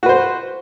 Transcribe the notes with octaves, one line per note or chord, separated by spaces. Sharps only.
F#4 B4 C5